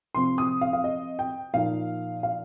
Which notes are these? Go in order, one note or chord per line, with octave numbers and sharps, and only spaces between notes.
C3 F3 C4 C6
D#6
F5
F5
D#5
G5
A#2 F3 D#4 F5
F5